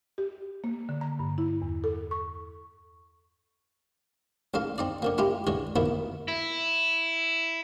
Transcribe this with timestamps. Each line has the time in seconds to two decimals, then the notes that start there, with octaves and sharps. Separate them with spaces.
0.18 G4
0.64 A#3
0.89 D3
1.01 A#5
1.19 G2
1.38 E4
1.62 E2
1.84 A4
2.11 C#6
4.54 A1 G#2 A4 F5
4.78 C4 D#4 D5
5.02 D3 F3 A#3
5.18 G#3 E4 F4 G4
5.47 D3 E3 G#3 C#5
5.76 B2 D#3 F3 A#3 B3 E4
6.28 E4